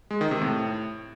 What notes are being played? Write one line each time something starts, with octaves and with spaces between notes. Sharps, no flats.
G#3
D#3
C3
A2